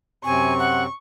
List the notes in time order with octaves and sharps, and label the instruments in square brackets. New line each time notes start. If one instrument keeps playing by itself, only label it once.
[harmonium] F#2 C3 C4 [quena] G#5 [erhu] C#6
[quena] F#5